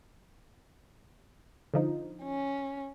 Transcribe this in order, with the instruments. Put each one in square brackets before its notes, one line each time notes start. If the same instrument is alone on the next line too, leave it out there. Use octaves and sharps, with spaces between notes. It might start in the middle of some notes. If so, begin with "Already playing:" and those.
[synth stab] D3 F3 D#4
[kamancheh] C#4